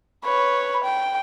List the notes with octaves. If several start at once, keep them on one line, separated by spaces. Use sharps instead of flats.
B4 C#5
G5